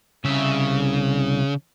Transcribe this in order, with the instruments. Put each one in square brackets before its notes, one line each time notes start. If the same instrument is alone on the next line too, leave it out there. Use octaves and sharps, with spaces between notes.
[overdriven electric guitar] C2 E5 [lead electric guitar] C#3